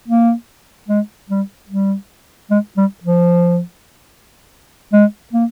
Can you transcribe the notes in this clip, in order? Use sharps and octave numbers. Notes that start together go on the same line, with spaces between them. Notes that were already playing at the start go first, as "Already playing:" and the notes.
A#3
G#3
G3
G3
G#3
G3
F3
G#3
A#3